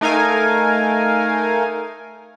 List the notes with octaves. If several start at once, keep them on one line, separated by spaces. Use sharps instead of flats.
A3 D#4 A#4 F5 G#5